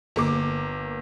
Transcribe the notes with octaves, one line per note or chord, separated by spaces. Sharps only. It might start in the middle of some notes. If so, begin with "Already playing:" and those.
G1 A#3 D6